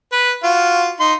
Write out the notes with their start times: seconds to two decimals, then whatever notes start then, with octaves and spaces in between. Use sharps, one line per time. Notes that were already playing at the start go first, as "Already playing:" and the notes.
0.13 B4
0.44 F4 F#4 F5
1.00 D#4 C6